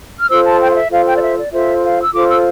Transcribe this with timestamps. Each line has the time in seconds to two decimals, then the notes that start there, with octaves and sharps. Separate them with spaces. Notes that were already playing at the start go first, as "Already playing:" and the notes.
0.20 F6
0.29 F4 A4 C5 E6
0.45 A5
0.60 G5
0.70 F5
0.75 E5
0.91 F4 A4 C5 F5
1.06 G5
1.17 D5
1.21 E5
1.37 D5
1.52 F4 A4 C5 E5
1.83 F5
2.02 E6
2.13 F4 A4 C5 D6
2.29 E6